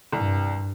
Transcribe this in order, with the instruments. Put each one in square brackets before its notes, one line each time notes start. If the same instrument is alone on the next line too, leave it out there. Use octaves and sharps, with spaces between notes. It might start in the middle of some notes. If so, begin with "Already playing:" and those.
[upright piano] C2 [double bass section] G2